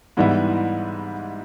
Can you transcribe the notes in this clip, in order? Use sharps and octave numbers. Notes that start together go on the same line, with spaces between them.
G#2 E3 G3 B3 E4